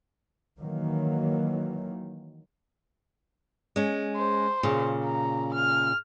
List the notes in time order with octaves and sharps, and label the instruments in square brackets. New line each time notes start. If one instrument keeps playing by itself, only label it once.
[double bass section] D#3 E3 F#3 A#3
[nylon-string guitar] G#3 C#4
[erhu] C5
[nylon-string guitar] A#2 C#3
[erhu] A#5
F6